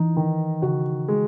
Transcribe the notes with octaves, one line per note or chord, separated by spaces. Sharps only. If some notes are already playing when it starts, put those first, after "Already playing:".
Already playing: E3 D#4
D#3
C#3 F#4
G#3